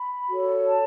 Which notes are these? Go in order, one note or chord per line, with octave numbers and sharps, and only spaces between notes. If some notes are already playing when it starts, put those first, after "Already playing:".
Already playing: B5
F#4 A4 C#5
A5